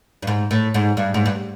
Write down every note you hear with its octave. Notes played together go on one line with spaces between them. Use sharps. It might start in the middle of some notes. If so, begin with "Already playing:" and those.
G2
G#2
A2
G#2
G2
G#2
G2